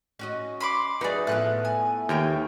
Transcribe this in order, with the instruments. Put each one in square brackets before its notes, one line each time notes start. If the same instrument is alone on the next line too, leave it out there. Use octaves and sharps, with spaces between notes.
[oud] C#4 F#4 D#5
[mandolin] B5 C6 D6
[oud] F#3 F#4 G#4 [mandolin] D#4 D5 [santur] B4 E5
[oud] A2 F3 B3 [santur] A3 [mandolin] F#6
[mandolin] G#5
[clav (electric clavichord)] D#2 [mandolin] F4 C#5 G5